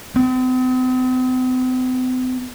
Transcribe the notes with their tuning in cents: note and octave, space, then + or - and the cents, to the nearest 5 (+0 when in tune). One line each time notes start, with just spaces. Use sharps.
C4 -45